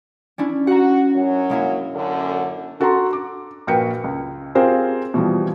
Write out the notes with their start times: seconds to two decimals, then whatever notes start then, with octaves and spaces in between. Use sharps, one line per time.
0.38 C#4 D4 E4
0.67 F#4 F#5 A#5
1.15 F#2 F#3
1.50 G#3 A#3 E4
1.95 F#2 D3
2.80 D4 F#4 A4 F#5 A#5 C6
3.13 D6
3.67 A#1 F#4 A#4 B4 G5 C#7
4.04 C#2
4.55 C4 F4 G4 G#4 A#4 C5
5.14 B2 E3 F3 G3